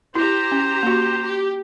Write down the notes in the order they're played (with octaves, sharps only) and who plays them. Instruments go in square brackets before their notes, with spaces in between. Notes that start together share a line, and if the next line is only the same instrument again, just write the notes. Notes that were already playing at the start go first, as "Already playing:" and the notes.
[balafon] E4 [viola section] G4 A#5 [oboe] C5
[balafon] C#4
A#3 F#4
[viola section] G4